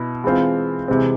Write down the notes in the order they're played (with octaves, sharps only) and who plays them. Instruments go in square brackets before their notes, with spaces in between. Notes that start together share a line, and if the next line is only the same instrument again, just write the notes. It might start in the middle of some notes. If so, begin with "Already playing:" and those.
Already playing: [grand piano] B2 E4
E3 G#3 C4 F4
C3 E3 G#3 C4